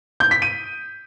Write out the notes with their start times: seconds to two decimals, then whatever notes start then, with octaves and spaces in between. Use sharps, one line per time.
0.20 G6
0.31 B6
0.42 D#7